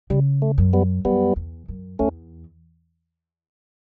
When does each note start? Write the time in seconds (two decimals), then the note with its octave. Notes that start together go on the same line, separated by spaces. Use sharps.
0.10 C#3 G3
0.42 A3
0.58 F#2
0.73 G3 B3
1.05 F#2 G3 B3
1.36 E2
1.68 F#2
1.99 E2 A3 C#4